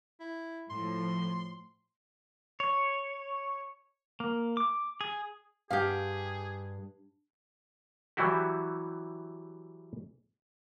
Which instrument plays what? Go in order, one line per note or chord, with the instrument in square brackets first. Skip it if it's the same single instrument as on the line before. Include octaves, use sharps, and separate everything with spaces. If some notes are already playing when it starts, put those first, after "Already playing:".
[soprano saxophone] E4
[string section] A2 F3 [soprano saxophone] C6
[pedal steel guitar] C#5
A#3
D6
G#4
[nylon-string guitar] G2 [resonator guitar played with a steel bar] G4 F5 [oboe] G#4
[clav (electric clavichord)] E3 F#3 G3 E4 F#4 G4